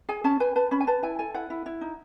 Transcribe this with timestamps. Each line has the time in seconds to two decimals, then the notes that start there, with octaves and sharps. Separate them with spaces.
0.09 G#4 G#5
0.24 C#4 A5
0.40 B4 G#5
0.56 B4 A5
0.71 C#4 B5
0.80 G#5
0.87 B4 A5
1.03 E4 G#5
1.19 A4 G#5
1.34 E4 F#5
1.50 E4
1.66 E4
1.81 D#4